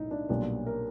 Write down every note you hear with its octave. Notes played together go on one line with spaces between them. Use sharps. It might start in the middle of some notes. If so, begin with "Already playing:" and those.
Already playing: B1 A2 D#4 E4
D4
B1 A#2 G3 B3 D4
A#4